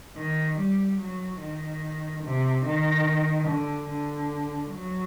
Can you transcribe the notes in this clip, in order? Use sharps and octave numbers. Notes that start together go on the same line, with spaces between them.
D#3
G3
F#3
D#3
C3
D#3
D3
D3
F#3